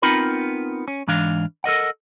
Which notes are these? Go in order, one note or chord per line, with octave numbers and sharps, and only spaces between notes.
B3 C4 D#4 F4 A#4 B5
C#4
G#2 E3 D4 F5
A4 A#4 D#5 F#5